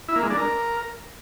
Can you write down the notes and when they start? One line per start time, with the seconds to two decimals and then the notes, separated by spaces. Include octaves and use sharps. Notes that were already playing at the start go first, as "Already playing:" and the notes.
0.08 E4
0.16 A#3
0.23 G#3
0.30 D4
0.37 A#4